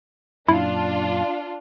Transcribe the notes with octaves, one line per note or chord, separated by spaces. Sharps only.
F#2 A#2 D4 E4 F4